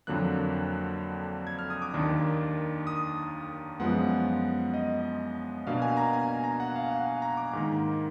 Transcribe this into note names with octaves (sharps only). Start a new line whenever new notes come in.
F2 D3 F#3 A#3 F#6
G#6
F6
D#6
D6
D#2 D#3 A#3 D4
D#6
F#2 F3 G#3 B3 F#5
D#5
B2 A#3 D4 F5
G#5
A#5
G#5
G#5
A#5
F#5
F5
F#5
G#5
A#5
D6
G#2 D#3 A#3